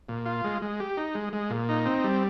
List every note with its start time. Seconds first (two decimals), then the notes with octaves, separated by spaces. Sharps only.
0.09 A#2
0.26 F4
0.44 G#3
0.62 G#3
0.80 G4
0.97 D#4
1.15 G#3
1.33 G#3
1.50 A#2
1.69 D#4
1.86 C4
2.04 G3